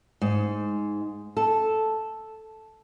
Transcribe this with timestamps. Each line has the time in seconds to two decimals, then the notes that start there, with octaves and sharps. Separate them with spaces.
0.22 G#2
1.37 A4